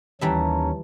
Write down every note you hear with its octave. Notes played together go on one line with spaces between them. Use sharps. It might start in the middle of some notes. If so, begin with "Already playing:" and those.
D#2 E3 G3 C#4 E5 A5 A#5